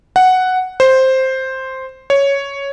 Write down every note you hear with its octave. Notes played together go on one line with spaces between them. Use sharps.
F#5
C5
C#5